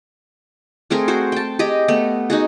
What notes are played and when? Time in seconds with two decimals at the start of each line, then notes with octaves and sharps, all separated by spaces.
0.90 A3 C4 G#4 A#4
1.08 F#4 C5
1.32 G5 A5
1.59 G4 G#4 D#5
1.88 A3 B3
2.30 D#4 F#4 G#4